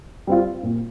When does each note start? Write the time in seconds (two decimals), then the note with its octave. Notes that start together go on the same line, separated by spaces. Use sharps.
0.27 G3 C4 F4
0.63 A#2